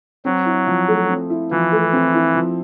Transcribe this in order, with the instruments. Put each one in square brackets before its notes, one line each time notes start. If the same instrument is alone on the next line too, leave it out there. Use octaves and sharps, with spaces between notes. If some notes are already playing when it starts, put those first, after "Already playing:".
[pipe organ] F#3 [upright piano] C4
[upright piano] E4
F3
A3
C4
E4
[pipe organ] E3 [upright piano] F3
[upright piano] A3
C4
E4
F3